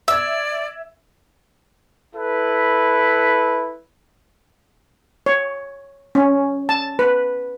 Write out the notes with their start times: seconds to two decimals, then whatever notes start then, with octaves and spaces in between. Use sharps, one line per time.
0.08 D5 E5 E6 G#6
2.15 E4 A4 B4
5.26 C#5
6.15 C#4
6.69 A5
6.99 B4